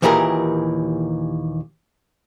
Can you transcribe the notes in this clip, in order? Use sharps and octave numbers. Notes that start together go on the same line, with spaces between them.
D#2 A#2 E3 G4 G#4 A#4